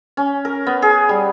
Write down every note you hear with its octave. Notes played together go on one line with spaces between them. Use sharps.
C#4
A#4
B3
G#4
G3